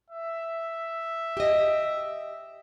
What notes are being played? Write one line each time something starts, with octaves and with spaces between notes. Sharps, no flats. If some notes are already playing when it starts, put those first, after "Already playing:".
E5
G4 D#5